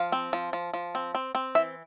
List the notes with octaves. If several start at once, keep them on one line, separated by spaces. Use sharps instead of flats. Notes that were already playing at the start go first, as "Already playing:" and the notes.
Already playing: F3 F5
C4
F3
F3
F3
C4
C4
C4
E3 E5